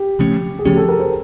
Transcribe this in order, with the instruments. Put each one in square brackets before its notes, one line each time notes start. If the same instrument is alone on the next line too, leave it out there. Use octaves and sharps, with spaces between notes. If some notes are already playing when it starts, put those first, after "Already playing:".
Already playing: [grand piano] G4
[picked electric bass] C#3 F3 A3 C#4
[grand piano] G#4
[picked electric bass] C#3 F3 A3 C#4 [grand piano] G4
[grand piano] A4
A#4
C5